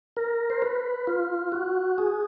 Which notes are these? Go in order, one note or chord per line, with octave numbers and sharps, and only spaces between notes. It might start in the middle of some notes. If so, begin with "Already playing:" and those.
A#4
C5
B4
F4
F#4
G#4